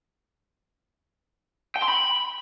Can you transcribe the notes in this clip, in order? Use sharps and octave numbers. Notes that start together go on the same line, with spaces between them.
G5
C6
B5